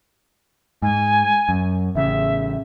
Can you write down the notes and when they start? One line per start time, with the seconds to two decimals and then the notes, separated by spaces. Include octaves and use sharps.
0.82 G#2 G#5
1.49 F#2
1.95 A1 C#3 E5